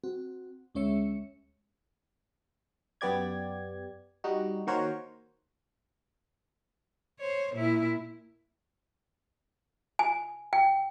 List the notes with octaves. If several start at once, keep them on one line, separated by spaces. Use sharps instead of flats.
C4 F#4
D2 G#3 C#4 C#5 E5 C#7
F#2 B3 G4 D5 G#6
G3 D#4 F#4
D#3 A#3 F#4 A#4 C5 C#5
C5 C#5
A#2 E4
G#5
G5